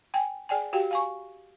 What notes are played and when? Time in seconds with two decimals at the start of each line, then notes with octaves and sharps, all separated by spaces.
0.14 G5 G#5
0.49 G#4 D5 G5 G#5
0.73 F#4 G4 F5 G5
0.91 F5 G#5 C#6